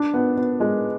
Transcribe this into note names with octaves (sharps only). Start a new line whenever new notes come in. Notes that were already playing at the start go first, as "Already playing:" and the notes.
Already playing: D4
B3
B3
G#3